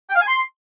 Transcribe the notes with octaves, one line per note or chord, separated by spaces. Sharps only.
G5
F5
G#5
C6